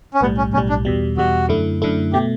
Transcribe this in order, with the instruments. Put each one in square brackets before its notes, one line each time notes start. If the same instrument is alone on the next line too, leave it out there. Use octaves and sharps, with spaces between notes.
[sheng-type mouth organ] C#4
[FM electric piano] B1 A2 G3 [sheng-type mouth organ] B3
[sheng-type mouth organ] C#4
[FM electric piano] B1 A2 G3 [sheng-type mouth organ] C#4
[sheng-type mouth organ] D4
[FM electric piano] E2 B2 G3
[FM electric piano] E2 B2 G3 [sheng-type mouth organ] F#4
[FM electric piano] F#2 D3 A3 E4
F#2 D3 A3 E4
[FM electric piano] B2 A3 [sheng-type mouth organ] G4